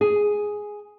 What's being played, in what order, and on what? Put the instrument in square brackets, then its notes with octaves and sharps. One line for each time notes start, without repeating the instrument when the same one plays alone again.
[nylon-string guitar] G#4